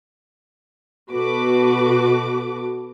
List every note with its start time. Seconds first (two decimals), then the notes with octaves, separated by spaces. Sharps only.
1.12 B2 F#4 A4 B4 D6